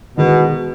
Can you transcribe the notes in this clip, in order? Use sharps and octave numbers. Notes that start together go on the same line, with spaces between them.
B2 D#3 G#3 B3 E4 A#4